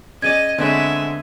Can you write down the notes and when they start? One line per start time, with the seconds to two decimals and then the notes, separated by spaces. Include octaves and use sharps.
0.22 C#4 G#4 D5 D#5 G#6 D#7
0.58 D3 G#3 B3 C4 C#5 D5 E5